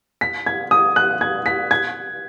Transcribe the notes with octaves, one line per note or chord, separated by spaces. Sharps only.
B6
G#6
D#6
F#6
G#6
B6
G#6